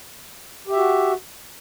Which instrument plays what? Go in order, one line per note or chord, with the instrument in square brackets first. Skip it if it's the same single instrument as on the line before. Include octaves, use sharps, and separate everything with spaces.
[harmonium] G4
E5
F#4